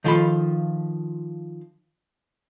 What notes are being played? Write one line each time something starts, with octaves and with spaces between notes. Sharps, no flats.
D#3 F3 F4 A4 B5